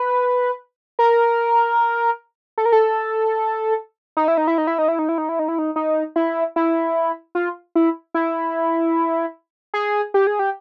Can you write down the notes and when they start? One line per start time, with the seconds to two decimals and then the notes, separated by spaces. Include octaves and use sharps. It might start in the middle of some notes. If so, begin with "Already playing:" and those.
Already playing: B4
0.99 A#4
2.58 A4
2.65 A#4
2.72 A4
4.17 D#4
4.28 E4
4.37 D#4
4.47 E4
4.58 D#4
4.67 E4
4.78 D#4
4.88 E4
4.99 D#4
5.09 E4
5.18 D#4
5.29 E4
5.39 D#4
5.48 E4
5.59 D#4
5.76 D#4
6.16 E4
6.56 E4
7.35 F4
7.75 E4
8.14 E4
9.74 G#4
10.14 G4
10.27 G#4
10.39 G4